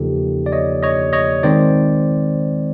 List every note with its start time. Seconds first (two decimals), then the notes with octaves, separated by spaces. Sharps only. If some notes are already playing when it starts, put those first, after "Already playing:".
Already playing: E2 C#3 F3 A#3 D#4 G4 A4
0.46 D5
0.52 C#5 D#5
0.83 C#5 D#5
1.13 C#5 D#5
1.43 D#3 G#3 C4 D#4 C5 D5